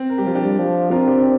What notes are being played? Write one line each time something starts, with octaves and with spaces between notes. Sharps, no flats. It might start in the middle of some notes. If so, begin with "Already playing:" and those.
Already playing: C4
A#4
G3 G4
F3 F4
D4 G4
G3
F3
C4 F4 A#4
D4 G4